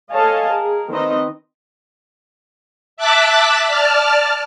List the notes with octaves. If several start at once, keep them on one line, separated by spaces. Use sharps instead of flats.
A4 C#5 D#5 F5 G#5 A5
G#4 A#4
D#3 C4 D#4 B4 D#5
E5 A5 D6 F#6 A6 B6
D5 A5 F6